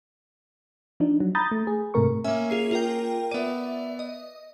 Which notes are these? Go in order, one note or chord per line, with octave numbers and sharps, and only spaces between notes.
F3 D4 D#4
F#3
A#5 B5 D#6 G6 A6
A3
G#4
G#2 C3 A3 A#4 C#6
A#3 C#4 E5 G#5
F4 G#4 C7
F4 A#4 G5
B3 D5 E5 D#7
D#5